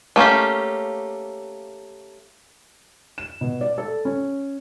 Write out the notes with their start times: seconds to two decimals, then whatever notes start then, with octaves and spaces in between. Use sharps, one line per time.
0.16 A3 A#3 C#4 G4
3.18 E7
3.41 B2
3.61 D5
3.78 A4
4.05 C#4